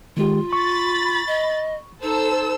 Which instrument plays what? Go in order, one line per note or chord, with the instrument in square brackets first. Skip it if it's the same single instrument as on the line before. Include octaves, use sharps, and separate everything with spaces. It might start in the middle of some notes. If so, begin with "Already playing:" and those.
[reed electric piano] D#3 G#3 G4 [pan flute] F4
[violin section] B5 A6 [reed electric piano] C#6
[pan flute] D#5
[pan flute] D#4 [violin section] A4 C5 E6